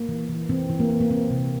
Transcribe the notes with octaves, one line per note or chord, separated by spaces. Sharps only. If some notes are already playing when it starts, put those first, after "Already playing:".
Already playing: A#3
E3
E3
E3 C4
E3
A#3
A#3
A#3
A#3 C4
C3